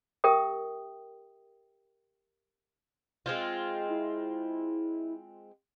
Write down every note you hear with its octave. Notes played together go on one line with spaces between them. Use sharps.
G4 A#4 E5 G5 D#6
G#3 C4 F4
E4